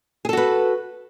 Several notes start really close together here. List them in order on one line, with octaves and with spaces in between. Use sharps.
G#4 A4 F#4 B4